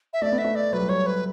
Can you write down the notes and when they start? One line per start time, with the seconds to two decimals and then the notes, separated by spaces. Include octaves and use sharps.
0.13 E5
0.22 A3 D5
0.32 B3
0.38 E5
0.44 A3
0.55 D5
0.73 F#3 B4
0.80 G3
0.88 F#3 C#5
1.06 B4